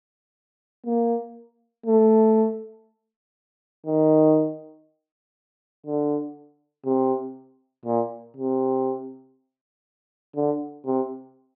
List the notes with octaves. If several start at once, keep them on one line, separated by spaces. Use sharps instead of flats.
A#3
A3
D#3
D3
C3
A#2
C3
D3
C3